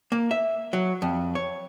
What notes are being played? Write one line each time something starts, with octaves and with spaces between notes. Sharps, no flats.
A#3
E5
F#3
F2
C#5